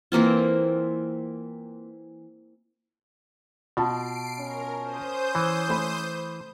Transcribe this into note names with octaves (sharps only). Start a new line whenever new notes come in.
E3 A#3 C4 F4
B2 F4 A5 C7 D7
C#4 A#4
C5 D#6 G6
E3
A3 B5